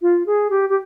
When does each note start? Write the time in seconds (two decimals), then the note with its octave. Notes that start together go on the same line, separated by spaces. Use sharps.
0.02 F4
0.26 G#4
0.50 G4
0.70 G4